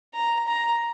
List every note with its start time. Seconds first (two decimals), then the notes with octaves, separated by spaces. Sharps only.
0.15 A#5
0.48 A#5